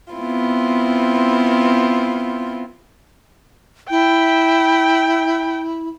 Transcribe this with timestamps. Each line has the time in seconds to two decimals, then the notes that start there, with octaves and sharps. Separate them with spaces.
0.14 B3 C4 E4 F4
3.90 E4 G5